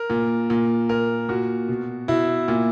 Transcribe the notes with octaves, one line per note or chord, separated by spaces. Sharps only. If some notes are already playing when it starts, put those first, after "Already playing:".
Already playing: A#4
A#2
A#2
A#2 A#4
A#2 F#4
B2
B2 E4
A#2